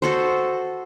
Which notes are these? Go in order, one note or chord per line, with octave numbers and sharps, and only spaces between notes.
F#4 A4 C5